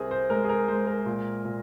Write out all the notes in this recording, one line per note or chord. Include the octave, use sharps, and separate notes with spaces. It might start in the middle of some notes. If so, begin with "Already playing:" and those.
Already playing: C2 C4 G#4 A#4
C5
G#3 A#4
G#4
A#4
G#3 C5
A#4
A#2
A#2